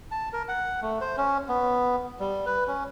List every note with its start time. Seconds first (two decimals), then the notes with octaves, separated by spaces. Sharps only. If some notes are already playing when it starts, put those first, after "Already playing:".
0.11 A5
0.33 A#4
0.48 F#5
0.82 A3
1.01 C5
1.17 C#4
1.49 B3
2.20 G3
2.46 B4
2.67 C#4